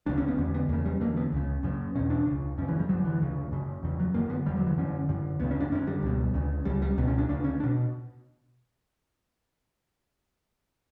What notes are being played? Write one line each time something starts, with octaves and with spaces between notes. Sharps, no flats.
D2 C#3 D4
C#4
B3
E2 D3 C#4
B3
E2 C#3 A#3
G3
E2 D3 A#3
B3
C#2 C#3
F#2 C#3
E2 B2 C#4
D4
C#2 C#3
F#2 C#3 C#4
E3
G3
F#2 D3 F#3
E3
D2 C#3
F#2 C#3
E2 C#3
F#3
F#2 D3 A#3
B3
E2 D3 G3
F#3
E3
F#2 D3 C#4
F#2 D3
D2 C#3 B3
C#4
D4
F#2 D3 C#4
G3
C#2 B2
D2 C#3
C#2 C#3 G3
G3
C#2 B2 B3
C#4
D4
D2 C#3 D4
C#4
D4
B2